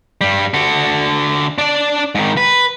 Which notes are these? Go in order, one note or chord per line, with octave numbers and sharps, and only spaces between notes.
G2 G3
D3 F#4
D4 D5
G#2 D#3
B4